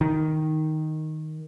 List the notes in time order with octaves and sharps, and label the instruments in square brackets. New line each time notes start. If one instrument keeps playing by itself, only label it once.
[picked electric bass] D#3